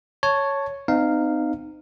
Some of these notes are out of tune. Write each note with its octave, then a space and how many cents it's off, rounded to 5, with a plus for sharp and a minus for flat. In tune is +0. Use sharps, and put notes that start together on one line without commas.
C#5 +0 A5 +5
C4 -40 D#4 -20 F5 +0